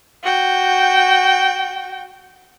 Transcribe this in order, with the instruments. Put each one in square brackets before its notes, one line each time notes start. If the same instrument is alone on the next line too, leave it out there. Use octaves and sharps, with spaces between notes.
[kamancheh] F#4 G5